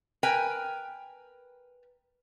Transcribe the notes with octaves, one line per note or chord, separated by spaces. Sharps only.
A#4 B4 G5 G#5